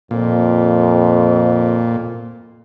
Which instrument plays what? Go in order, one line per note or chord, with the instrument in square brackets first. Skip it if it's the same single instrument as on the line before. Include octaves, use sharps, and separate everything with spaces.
[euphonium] F2 [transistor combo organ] A#2